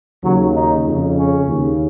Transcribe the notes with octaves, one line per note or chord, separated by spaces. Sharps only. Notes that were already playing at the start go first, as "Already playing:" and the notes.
D#2 C#3 F#3
D#4
F2 C#3
C#4
D#2 C#3